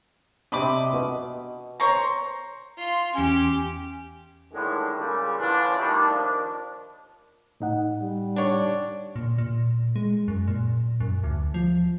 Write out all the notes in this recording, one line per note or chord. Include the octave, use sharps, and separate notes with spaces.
C3 C4 D4 D#5 B5 D6
B2
C5 C#5 A#5
F4 C6
E2 C#4 G4 G#5
A2 D3 D#3 G3 G#3
A#2 C#3 G3
A2 D3 E3 C#4 D4 F4
D#3 G3 A3 D4
D#2 D#3 F3 A#3 D4
A2 D#4 F#5
G3
D4 C#5
A#2
A#2
G#3
F#2
A#2
F#2
D2
F3